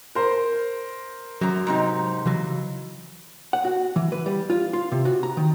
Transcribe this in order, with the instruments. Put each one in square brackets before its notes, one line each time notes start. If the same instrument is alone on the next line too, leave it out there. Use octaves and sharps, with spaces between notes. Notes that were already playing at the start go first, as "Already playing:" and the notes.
[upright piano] A#4 C5
[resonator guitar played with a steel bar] F#2 A#5 [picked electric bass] F#3
[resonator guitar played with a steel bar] G#2 C3 D#4
[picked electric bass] C#3 E3 F#3
[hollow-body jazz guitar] F#5
F#4
E3
B4
G3
F4
F4
C3
F#4
A#5
D#3